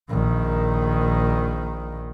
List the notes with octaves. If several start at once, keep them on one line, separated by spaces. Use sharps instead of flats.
A#1 D#3